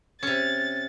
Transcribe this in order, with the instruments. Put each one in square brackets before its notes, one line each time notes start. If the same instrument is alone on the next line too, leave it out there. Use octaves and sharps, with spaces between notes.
[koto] C3 C#4 [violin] A6